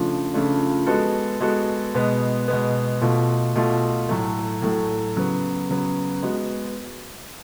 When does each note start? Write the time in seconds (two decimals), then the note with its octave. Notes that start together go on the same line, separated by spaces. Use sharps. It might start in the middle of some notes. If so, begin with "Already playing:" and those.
Already playing: C#3 F3 A3 D4 F4
0.34 C#3 F3 A3 D4 F4
0.87 G#3 B3 F#4 A4
1.41 G#3 B3 F#4 A4
1.95 B2 G#3 B3
2.48 B2 G#3 B3
3.02 B2 A3 F4
3.56 B2 A3 F4
4.09 A2 F#3 A3
4.62 A2 F#3 A3
5.16 C#3 F#3 B3
5.69 C#3 F#3 B3
6.23 G#3 B3 F#4